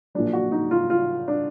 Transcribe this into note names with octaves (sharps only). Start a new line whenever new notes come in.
A#1 A#2 F#3 D4
F#4
D#4
F4
F4
D4